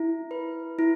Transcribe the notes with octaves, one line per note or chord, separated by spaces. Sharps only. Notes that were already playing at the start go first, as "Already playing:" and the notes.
Already playing: E4
B4
E4